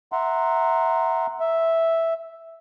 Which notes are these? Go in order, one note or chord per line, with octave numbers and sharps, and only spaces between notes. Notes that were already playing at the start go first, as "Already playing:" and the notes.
E5 F#5 A#5 C6
E5